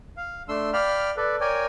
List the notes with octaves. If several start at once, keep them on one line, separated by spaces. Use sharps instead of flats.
F5
A3 D4 C6 E6
D5 F5 G5 B5 F6
A4 B4 D5
A#4 C#5 D5 G5 G#5